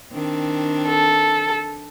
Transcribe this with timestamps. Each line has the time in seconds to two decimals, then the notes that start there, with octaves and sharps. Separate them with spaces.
0.13 D#3 C4 D4
0.87 A4